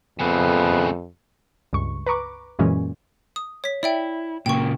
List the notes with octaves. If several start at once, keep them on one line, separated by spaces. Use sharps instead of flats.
F2 C#3 A3 B3
C#2 G2 C#6
B4 A#5 C#6 D6
F#2 A#2 E3 G#3 C#4
D#6
C#5 B6
E4 D5 E5 G5
A#2 C#3 A#3 G5 C#6